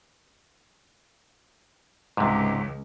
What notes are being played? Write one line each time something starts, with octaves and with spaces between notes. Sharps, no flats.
C#2 G#2 C3